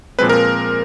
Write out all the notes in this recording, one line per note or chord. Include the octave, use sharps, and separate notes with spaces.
A#2 F3 G#3 C4 B4
A#4